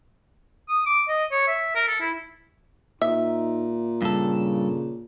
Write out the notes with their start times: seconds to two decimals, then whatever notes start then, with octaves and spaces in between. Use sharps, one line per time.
0.69 D#6
0.86 D6
1.08 D#5
1.31 C#5
1.48 E5
1.75 A#4
1.87 A4
2.01 E4
3.02 A#2 D#4 E5
4.02 G2 C#3 A4